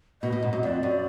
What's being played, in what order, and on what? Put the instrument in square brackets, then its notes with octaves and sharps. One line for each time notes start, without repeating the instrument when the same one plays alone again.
[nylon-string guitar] B2 [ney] D#5
[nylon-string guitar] B2
G#2
F#2
[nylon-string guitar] F2 [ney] D5
[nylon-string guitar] F#2